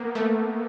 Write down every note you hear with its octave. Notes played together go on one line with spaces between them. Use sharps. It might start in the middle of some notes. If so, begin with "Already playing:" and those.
Already playing: A#3 B3
A3